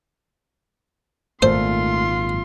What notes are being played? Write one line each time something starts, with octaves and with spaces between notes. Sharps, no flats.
G#1 A#2 A3 F4 C5 C6